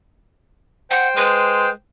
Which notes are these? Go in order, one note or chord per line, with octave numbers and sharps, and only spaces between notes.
C5 F#5 G5
G#3 B4